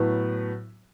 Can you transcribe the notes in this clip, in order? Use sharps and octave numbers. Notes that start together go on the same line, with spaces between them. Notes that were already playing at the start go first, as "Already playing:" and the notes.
Already playing: A2 F#3 B3 F#4 B4